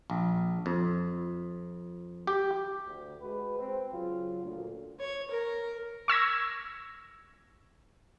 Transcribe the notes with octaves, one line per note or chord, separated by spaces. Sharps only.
A#1
F2
G4
D2
G#3 F#4 B4
C4
C#3 F#3 F4
D2 A#2
C#5
A#4
C#6 E6 G#6 A#6